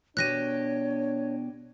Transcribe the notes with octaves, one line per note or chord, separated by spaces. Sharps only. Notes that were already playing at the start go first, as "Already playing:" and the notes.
B2 D4 G4 C#5 F#6 A#6 D#7